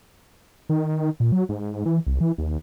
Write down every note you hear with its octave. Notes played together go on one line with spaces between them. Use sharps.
D#3
A#2
F#3
G#2
E3
C2
E3
D#2